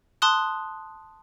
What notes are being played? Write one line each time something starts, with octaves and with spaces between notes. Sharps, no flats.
A5 C6 D#6 F#6